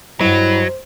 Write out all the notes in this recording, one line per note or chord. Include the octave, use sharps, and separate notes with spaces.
G2 B2 F#3 E4 C5 D#5